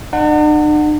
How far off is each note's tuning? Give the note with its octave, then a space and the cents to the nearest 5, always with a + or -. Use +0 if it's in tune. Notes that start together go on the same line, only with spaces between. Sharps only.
D4 +45 F#5 +0